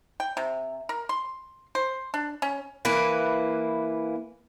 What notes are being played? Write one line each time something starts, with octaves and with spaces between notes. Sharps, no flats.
G5
C3
A#4
C6
C5
D4
C#4
E3 A#3 E4 B4